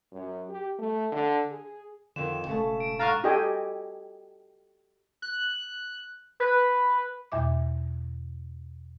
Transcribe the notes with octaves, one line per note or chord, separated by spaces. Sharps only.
F#2
G4
A3
D3
G#4
F2 D3 D#3 E7
E1 C#3 A3 A5
D7
G#2 D3 F5 A#5 C#6 F#6 A6
F#4 G4 A4 D#5 G5 G#5
F#6
B4
E2 B2 E5 D6